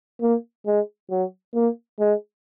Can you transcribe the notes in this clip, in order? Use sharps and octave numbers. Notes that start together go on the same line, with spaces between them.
A#3
G#3
F#3
A#3
G#3